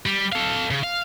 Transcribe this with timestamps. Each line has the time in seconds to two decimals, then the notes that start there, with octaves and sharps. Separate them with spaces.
0.06 G3
0.32 A4 F5
0.71 C#3
0.83 F5